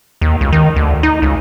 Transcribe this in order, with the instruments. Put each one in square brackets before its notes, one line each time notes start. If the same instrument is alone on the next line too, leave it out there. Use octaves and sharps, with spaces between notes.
[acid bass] D#2
C#2
D#3
D2
D#4
C#2